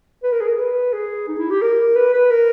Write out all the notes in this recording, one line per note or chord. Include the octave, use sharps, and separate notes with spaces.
B4
A#4
G#4
A#4
B4
G#4
D#4
E4
G4
A#4
B4
B4
A#4